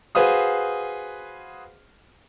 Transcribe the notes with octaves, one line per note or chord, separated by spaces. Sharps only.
F#4 G#4 B4 C5 F5 D#6